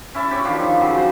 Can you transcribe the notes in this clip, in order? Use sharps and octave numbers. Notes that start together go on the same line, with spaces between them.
C#4 E4 E5 A5
G4 C#5 B5 C#6
D#3 F3 D4 F4
C#3 F#3
C5